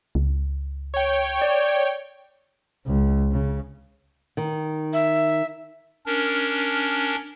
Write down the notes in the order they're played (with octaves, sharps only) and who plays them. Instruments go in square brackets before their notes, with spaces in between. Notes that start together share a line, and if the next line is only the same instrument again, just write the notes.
[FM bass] C#2
[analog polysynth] C#5 G5
[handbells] D5
[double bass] C#2
C#3
[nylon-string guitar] D#3
[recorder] E5
[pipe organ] C#4 D4 A#4